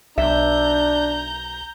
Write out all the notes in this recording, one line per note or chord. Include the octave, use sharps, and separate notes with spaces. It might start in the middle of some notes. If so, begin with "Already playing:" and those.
B1 D4 E5 A#5 G6